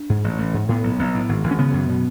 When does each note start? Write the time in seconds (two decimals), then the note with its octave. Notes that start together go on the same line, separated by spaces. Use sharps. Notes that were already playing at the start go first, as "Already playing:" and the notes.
Already playing: D4
0.09 G#2
0.24 A1
0.39 A1
0.54 G#2
0.69 A2 B3
0.83 B1
0.99 B1
1.15 A2
1.29 G#1
1.44 G#1
1.51 C#4
1.58 C#3 B3
1.74 F#2
1.89 B2